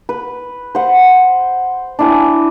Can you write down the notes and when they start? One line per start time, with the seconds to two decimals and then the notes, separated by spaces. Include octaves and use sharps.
0.09 B4
0.75 C5 F#5
1.99 D4 E4 G#5